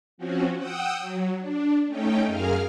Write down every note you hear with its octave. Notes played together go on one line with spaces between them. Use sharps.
F3 C4 C#4 F#4
F#5 G5 D#6 E6
F#3
D4
A3 C#4 D#4 G5
F#2 G#4 A#4 F5 F6